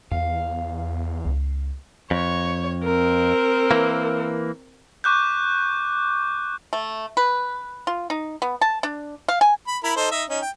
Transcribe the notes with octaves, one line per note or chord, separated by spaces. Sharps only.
E2 B3 F5
C#2
F2 C#5
C4 A#4
E3 A#3
C#6 D6 F#6 G6
A3
B4
F4
D#4
B3
A5
D4
F5
G#5
B5
E4 A#4 B5
D#4 A4 C5
D#4 D#5 E5
C#4 D#4
G5